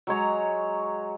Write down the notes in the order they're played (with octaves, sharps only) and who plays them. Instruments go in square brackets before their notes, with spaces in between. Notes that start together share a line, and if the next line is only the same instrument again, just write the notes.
[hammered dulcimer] F#3 G#3 C#5 A#5